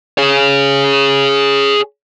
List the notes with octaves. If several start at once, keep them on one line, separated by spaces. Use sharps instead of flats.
G#4 C#5